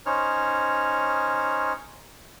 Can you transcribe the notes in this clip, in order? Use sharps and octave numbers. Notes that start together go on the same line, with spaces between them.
C#4 D#4 C5 C#5 F6